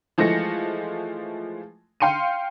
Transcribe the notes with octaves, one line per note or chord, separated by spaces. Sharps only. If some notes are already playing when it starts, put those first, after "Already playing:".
E3 F3 G#3 A3 A#6 C#7
F5 G5 C6 C#7 D#7